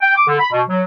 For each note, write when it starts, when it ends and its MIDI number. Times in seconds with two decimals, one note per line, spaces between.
0.02 0.15 79
0.15 0.23 86
0.27 0.39 50
0.39 0.48 83
0.51 0.62 47
0.69 0.83 54